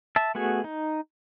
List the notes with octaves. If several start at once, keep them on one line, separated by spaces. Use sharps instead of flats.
E5 A5
A3 B3 F#4 G#4
D#4